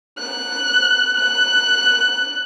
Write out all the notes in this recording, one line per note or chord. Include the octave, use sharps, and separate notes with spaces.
F#6
F#6